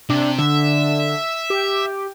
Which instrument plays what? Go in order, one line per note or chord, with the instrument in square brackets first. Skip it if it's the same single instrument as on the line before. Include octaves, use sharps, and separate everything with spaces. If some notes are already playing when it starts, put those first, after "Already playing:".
[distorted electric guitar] C3 [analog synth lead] D4
[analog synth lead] D3 [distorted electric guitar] E5
[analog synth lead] G4